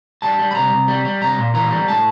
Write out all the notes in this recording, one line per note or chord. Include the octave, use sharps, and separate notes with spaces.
G3 A5
G3
B5
C2 A#5
C2
G3
G3
C2 A#5
A#2
E3 A#5
G3
A2 A5